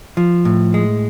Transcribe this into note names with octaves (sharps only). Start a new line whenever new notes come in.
F3
A2
G#3